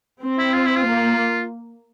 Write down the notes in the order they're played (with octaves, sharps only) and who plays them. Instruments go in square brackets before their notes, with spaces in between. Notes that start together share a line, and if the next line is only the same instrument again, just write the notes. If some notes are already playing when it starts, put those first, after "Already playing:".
[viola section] C4
[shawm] E4
F4
E4
F4
[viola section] A#3